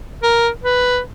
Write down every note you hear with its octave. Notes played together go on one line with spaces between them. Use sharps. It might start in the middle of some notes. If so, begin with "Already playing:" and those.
A#4
B4